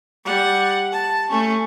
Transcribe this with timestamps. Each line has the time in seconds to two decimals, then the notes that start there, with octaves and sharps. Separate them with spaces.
0.24 G3 F#5
0.92 A5
1.30 A3 C#4